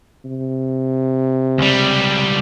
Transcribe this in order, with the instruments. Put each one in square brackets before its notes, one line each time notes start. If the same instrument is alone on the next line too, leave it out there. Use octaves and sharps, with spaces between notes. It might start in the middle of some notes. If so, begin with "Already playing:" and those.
[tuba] C3
[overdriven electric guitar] C#2 G3